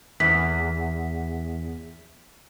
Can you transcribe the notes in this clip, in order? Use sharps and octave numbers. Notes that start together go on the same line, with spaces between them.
E2 B6